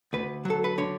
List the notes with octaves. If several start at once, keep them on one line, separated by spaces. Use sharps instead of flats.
D2 B4
F#3 A4
B4
D3 C#5